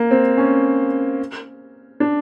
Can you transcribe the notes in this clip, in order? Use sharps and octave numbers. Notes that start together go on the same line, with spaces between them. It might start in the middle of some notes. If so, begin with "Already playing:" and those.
Already playing: A#3
C4
C#4
D4